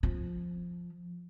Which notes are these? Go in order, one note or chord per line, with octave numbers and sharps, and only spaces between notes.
F3